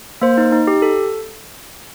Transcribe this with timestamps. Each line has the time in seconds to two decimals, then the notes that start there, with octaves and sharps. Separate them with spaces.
0.22 A#3 C5
0.37 D#4
0.52 D#4
0.67 G4
0.82 A4